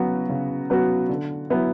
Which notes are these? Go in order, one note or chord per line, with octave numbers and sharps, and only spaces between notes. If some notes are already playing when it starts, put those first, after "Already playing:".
Already playing: C#3 F#3 B3 F#4
C#3
F#3 B3 F#4
D3
F#3 B3 E4